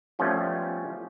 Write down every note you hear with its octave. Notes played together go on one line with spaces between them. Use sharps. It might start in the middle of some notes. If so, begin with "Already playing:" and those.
F3 G3 A3 B3 C#4 F4